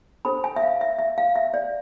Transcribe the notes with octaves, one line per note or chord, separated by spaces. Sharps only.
D4 A4 C5 B5
G#5
E5
F5
E5
E5
F5
E5
D5